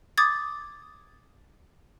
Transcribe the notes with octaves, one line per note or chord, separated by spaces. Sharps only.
D6 D#6 G#6 A6